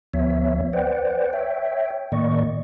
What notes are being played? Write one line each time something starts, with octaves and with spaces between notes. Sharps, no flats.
D2 F3 B3 C#5 E5
B4 C5 D5 F#5 G5
C#5 E5 G5
A2 D#3 A#3 D5 D#5 C#6